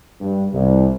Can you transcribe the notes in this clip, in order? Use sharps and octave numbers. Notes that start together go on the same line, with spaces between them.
G2
C2